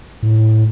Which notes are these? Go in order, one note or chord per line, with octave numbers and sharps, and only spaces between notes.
A2